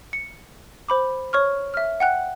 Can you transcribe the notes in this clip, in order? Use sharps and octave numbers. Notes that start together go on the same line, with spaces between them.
C#7
C5 B5 D6
C#5 C#6 F6
E5 F6
F#5 G5 F#6